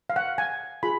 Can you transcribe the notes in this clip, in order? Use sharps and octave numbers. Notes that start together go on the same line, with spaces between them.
F5
F#5
G#5
F4 G#4 B5